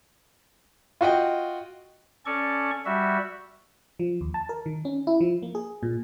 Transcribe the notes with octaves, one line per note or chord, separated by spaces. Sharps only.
F4 F#4 D#5 G5
C#4 A4 D5 C#6
G3 F#4 E5
F3
D#2
A5
A#4
D#3
C#4
E4
F3
A#3
G#4
A#2